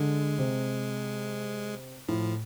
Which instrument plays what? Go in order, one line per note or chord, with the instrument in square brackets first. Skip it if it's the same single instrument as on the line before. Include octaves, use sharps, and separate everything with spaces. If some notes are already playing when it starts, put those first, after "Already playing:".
Already playing: [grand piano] D3 [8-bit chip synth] G#3
[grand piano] C3
[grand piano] A2 [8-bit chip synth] F3